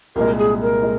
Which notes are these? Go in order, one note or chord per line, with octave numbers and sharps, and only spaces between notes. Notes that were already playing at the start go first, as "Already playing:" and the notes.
C2 A#2 G#3 A#4
G#4
A#4
G#3